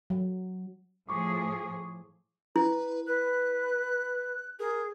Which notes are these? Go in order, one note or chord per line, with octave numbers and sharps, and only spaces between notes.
F#3
A2 F3 G#4 C#6 D6
E4 B4
B4 F#6
G#4 A#4